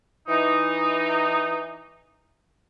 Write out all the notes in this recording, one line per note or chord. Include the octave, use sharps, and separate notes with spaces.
E3 D#4